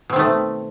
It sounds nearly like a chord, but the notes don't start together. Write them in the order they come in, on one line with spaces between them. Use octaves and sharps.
B2 C4 D#3 A3